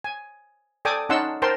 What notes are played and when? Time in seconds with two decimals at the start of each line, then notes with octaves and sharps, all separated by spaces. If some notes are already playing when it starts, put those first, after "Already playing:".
0.04 G#5
0.85 A4 D5 G5 G#5 D6 D#6
1.09 C#4 D#4 F#5 A5 C6 E6
1.42 A#4 C5 G5 A5 C6